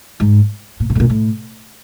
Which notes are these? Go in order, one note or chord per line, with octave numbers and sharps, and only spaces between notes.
G#2
A#2
B2
A2
A#2
A2